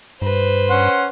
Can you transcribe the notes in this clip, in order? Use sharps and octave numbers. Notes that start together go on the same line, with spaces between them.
G2 B4 C5
C#4 F#5 C6